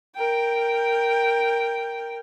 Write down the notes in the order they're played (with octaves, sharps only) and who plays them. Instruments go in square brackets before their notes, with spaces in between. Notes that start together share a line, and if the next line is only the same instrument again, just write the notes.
[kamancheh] A#4 G5